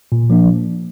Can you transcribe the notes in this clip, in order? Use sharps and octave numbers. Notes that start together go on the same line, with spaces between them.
A#2
F3 A#3 D4